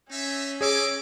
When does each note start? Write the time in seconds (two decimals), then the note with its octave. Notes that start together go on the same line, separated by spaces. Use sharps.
0.12 C#4 D#4 E5
0.61 G#4 C#5 D#5 G#5 D6 E6